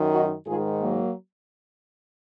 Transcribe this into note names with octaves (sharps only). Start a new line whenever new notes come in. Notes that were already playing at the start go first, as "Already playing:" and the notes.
Already playing: F#2 D#3
D#4 F#4
G#2 D#3 F4 G#4
F#3 A#3